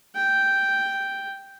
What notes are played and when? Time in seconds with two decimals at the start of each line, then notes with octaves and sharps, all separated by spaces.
0.16 G5